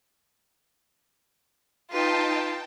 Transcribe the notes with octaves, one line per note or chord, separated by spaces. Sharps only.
D#4 F4 B4 G5 A5